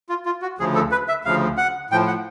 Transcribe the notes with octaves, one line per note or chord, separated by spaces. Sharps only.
F4
F4
F#4
D2 C#3 F3 G#4
A4
B4
E5
D2 C#3 F3 F5
F#5
A2 F3 G5
F#5